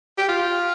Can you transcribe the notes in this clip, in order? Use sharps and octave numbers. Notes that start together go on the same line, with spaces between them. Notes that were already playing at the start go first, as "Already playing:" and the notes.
G4
F4